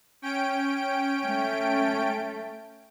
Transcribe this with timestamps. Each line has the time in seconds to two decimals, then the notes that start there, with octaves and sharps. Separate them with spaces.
0.22 C#4 G5 D7
1.27 A3